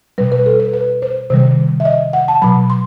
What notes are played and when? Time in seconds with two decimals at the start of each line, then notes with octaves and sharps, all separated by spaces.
0.18 B2 G3 B4
0.32 B4
0.46 A4
0.60 B4
0.73 B4
1.02 C5
1.30 C3 D#3 G3 C5
1.80 E5
1.85 D#5
2.13 F#5
2.28 A5
2.42 B2 F#3 B5
2.70 C6